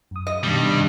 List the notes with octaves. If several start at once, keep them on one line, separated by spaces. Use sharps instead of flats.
F#2 D#6
D#5
G2 B2 D#3 G3
C3 D#3 D4